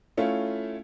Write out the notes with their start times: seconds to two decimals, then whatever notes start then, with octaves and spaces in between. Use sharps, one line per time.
0.17 A3 C#4 E4 F4